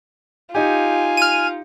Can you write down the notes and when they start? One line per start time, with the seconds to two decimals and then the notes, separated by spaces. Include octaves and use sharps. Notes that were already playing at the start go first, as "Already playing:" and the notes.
0.55 D#4 F4 G4 G#5
1.17 F6 D#7